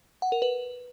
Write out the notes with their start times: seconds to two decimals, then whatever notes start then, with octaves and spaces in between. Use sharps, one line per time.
0.22 F#5
0.32 A#4
0.42 B4